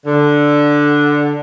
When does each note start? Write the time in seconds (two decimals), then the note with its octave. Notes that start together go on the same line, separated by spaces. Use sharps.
0.06 D3